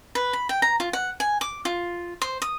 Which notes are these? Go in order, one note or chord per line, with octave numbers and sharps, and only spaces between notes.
B4
B5
G5
A#5
F4
F#5
G#5
D6
F4
C5
D#6